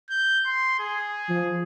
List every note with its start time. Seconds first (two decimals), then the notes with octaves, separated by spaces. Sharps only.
0.10 G6
0.46 C6
0.80 G#4
1.29 F3